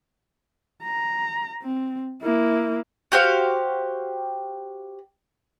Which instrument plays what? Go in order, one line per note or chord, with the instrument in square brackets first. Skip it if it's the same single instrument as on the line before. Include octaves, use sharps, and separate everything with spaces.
[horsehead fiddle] A#5
C4
A#3 E4
[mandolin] F#4 G4 C5 F5